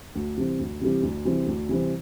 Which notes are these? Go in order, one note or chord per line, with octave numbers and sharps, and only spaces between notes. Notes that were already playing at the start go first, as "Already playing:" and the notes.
D2
C3 E3 G3 C4
D2
C3 E3 G3 C4
D2
C3 E3 G3 C4
D2
C3 E3 G3 C4